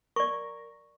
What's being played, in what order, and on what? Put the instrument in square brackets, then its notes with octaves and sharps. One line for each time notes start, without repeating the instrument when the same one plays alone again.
[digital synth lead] A#4 [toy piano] D5 C#6